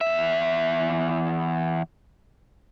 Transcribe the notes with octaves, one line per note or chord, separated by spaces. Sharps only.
E2 E5